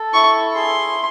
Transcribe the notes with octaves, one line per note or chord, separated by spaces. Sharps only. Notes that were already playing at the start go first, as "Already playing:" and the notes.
Already playing: A4
E4 C#6
G#4 C6